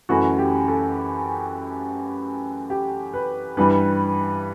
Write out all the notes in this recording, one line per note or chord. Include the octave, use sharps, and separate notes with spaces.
F#2 E3 A3 C#4 F#4
G4
A4
G4
B4
G2 E3 G3 B4